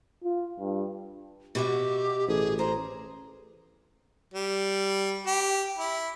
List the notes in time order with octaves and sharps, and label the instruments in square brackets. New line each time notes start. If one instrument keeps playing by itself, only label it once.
[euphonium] F4
G2
[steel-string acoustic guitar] B2 F#4 E5 [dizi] G4
[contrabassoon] A1 [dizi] G#4
[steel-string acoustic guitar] C5 [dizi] A#5
[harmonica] G3
G4
E4